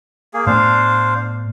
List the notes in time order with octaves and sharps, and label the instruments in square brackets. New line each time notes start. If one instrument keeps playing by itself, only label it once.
[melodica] A#3 G#4
[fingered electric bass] A2 A3 B3 [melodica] D4 C5 F5